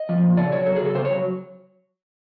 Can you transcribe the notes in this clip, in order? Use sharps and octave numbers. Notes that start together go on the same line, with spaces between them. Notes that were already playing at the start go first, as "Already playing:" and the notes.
Already playing: D#5
F3
A#2
C#3 D5
F#3 C#5
F#3 A4
G#4
C#3 A4
C#3 C5
C#5
F#3